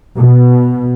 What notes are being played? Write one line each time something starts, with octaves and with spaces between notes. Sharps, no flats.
B2